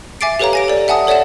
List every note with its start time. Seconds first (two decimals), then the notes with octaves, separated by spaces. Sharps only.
0.21 E5 G#5 D6 A6 C7 D7
0.39 G4 A4 B4 C#5 F5 A#5
0.53 G#5 A#6 D7
0.68 A4 D5
0.88 E5 F#5 G#5 A5 D#6
1.07 A4 C#5 D5 E5 F#5 E7